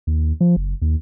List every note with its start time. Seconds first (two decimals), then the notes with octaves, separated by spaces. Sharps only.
0.07 D#2
0.41 F3
0.56 F#1
0.82 D#2